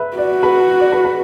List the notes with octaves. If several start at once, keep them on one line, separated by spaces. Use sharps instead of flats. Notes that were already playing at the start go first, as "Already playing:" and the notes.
Already playing: B4 E5
F#4 D5
B4
D5
B4
B4